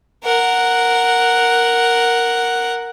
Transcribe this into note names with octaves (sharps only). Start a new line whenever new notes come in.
A#4 F#5